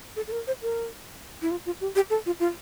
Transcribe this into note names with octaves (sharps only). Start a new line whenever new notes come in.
A4
A4
A#4
C5
A#4
E4
F4
F4
G4
G4
A4
F4
F4